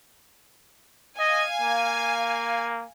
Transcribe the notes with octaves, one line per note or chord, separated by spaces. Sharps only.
D#5 F5 G#5
A#3